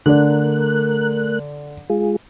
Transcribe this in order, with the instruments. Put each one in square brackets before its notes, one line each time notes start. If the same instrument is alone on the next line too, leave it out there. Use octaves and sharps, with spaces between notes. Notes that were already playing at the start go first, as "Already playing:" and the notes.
[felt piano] D3 D5 [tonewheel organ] A3 A#4 F#6
[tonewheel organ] G#3 F4 G#4